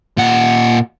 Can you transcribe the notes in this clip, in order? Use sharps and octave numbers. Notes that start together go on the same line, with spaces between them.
A#2 F#5